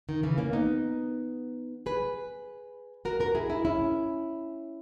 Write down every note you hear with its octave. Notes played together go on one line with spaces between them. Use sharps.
D#3
C#3 E3
A#3 C#4
B3 D#4
G#4 B4
F#4 A#4
F#4 A#4
E4 G#4
E4 G#4
C#4 E4